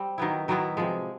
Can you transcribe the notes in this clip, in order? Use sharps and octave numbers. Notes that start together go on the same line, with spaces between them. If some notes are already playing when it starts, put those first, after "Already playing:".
Already playing: G3 C4
D#3 F#3 B3 E4
D#3 F#3 B3 E4
C3 F3 G#3